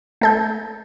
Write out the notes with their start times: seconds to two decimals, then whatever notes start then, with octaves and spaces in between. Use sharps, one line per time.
0.21 A3 A4 G6